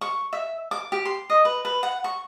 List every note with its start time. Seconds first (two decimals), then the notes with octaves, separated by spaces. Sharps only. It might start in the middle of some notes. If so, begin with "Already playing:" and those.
0.01 C#6
0.33 E5
0.71 D6
0.92 G4
1.05 C6
1.30 D#5
1.45 B4
1.65 B4
1.83 F#5
2.04 C#6